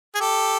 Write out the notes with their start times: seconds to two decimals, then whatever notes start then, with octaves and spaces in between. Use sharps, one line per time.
0.15 G#4
0.21 G4 A4